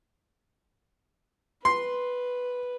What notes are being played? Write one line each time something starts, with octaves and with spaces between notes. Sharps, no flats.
B4 C6